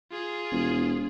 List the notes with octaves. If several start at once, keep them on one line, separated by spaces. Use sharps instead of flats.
F4 G#4
E1